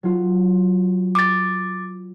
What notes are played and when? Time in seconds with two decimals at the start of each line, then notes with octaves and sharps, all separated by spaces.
0.03 F#3 F4
1.15 D6 A6